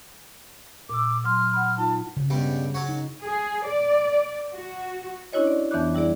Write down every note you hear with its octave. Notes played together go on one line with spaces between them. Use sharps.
A#2 D6 E6
F#3 C6 F6
F#5 B5
D#4 F4 A5
C#3
G2 B2 G3
F#3 C#4 F#4
D#4
G#4
D5
F#4
C#4 D4 E4 F#4 C#5 D#5
D5
F2 E3 B3 D4 F#6
G3 E4 G#4 D5